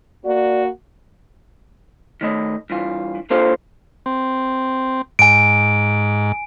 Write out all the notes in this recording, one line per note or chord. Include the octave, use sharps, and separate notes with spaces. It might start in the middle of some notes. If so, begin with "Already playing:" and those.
A#3 F#4 D5
D#3 A3 D#5
G2 E3 F4
A#3 D4 F4 A4 C5 F5
C4
G#2 G#5 D7